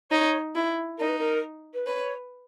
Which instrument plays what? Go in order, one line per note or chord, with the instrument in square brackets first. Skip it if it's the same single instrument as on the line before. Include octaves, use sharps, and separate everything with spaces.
[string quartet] D#4 [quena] C#5
[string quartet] E4
[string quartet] D#4 [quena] A#4
[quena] B4
A#4
B4
[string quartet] B4 [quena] C#5